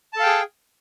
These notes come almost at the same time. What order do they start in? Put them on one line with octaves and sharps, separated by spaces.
A5 A4 F5 G5 G#4